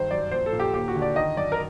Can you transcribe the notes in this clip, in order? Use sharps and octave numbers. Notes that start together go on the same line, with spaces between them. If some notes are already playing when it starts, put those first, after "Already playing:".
Already playing: G2 D#3 C5
F#2 D5
A#1 C5
A4
A#2
G4
D#2 G4
F#4
D3
D5
D#3 D#5
F#2 D5
A#4